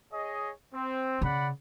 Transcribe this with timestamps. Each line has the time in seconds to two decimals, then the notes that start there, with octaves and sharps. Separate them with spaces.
0.12 G#4 C#5 D#5
0.75 C4
1.22 C#3 D5 F#5 B5